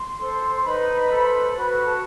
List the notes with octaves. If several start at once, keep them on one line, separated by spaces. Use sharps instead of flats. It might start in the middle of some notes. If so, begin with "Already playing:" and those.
Already playing: C6
A4 C5
C6
D#4 B4 B5
A4 C5
F#4 B4 B5
B5
A4 A5